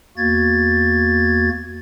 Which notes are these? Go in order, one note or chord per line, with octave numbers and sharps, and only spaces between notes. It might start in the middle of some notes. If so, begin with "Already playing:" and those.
E2 A#3 F#4 G#6 A6